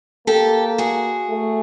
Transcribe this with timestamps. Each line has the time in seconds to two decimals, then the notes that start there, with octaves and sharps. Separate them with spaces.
0.27 A#3 G4 A4
0.78 F#4 G#4
1.30 A3